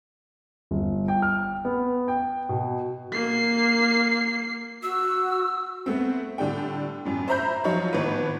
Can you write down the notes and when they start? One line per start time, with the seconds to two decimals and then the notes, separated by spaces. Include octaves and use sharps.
0.71 G1
1.08 G5
1.22 F6
1.65 B3
2.08 G5
2.49 B2
3.12 A#3 C7
4.83 F#4 E6
5.86 A3 B3 C4
6.38 A2 D3 G3 D4 G5
7.05 F#2 A2
7.28 C5 E5 A#5 B5 G6
7.64 F3 F#3 D#4 F4 C#5
7.93 G#1 A2 B3 B4